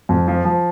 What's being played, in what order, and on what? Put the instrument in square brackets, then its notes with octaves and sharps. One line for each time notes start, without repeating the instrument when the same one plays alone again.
[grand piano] F2
F3
F3